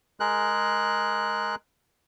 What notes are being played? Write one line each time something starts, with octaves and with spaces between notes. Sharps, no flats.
G#3 G#4 A#4 F#6